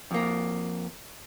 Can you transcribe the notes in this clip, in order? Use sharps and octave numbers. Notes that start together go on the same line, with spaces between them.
F2 A#3